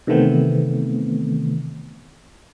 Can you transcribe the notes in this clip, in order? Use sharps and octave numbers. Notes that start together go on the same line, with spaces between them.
C3 D#3 E3 A3 B3 C4